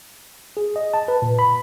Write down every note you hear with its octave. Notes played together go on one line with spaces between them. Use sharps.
G#4
D#5
A5
B4
A#2
B5